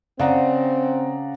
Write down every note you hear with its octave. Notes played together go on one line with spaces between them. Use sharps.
C#3 C4 D5 F#5 A#5